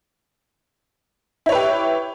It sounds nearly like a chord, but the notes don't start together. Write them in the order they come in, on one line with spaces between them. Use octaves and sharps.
E4 C#5 B4 G4